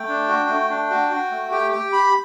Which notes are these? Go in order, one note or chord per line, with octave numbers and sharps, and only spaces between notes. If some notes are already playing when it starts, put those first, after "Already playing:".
Already playing: A3 G5
D4
F#4
A3
D4
F#4
F#4
A3
G4 G5
G4 G5
G4 B5